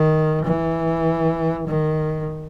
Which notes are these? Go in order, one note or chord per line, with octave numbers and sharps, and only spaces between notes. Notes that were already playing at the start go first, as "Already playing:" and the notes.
Already playing: D#3
E3
D#3